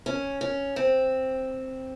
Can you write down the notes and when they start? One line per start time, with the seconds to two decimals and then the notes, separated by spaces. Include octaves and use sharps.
0.06 C#4
0.41 C#4
0.76 C4